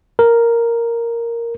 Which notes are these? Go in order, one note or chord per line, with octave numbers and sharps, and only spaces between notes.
A#4